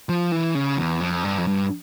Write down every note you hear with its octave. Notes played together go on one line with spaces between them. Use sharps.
F3
E3
C#3
E2
F2
G2
F2
G2